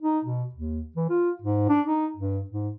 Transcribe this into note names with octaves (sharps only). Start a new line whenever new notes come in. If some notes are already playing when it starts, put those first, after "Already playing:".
D#4
B2
D#2
E3
F4
G#2
D4
D#4
G2
G#2